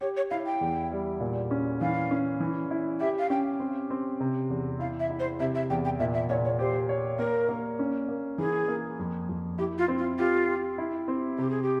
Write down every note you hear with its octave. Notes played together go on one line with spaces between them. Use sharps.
G4 C#5
C#5
E4 F5
G5
E2
G3
A#2
C#4
E3 F5
C#4
E3
E4
G4 E5
F5
C#4 G5
C4
C4
C3
E2
E4 F5
E5
E4
C5
C3 E5
E5
E2 G5
G5
A#2 E5
E5
A#2 C#5
C#5
G4 C5
C#5
A#3 A#4
A#3
C#4
A#3
E3 G#4
A#3
F2
F2
E4 G4
F4
C4
F4
F4 G4
G4
E4
C4
C3 G4
G#4
G4